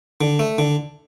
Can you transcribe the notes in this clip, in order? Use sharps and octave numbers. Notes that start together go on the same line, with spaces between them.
D3
A3
D3